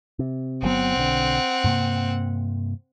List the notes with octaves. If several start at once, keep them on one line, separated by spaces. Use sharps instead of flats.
C3
G1 F#3 B3 C4 F#5
B1 D3
G2 C3 A#3